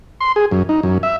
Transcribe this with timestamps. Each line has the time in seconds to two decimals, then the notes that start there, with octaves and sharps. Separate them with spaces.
0.21 C6
0.36 G#4
0.51 F#2
0.69 D#4
0.83 F#2
1.03 E5